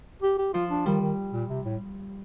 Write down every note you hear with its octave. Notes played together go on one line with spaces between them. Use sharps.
G4
G4
F3 F4
D4
D#3 G3
D#3
A#2
C3
A2